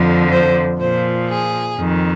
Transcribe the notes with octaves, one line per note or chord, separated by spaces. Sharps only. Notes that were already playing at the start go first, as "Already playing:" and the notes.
Already playing: F2 D3 F3
C5
A#2 F3 C5
G#4
F2 D#3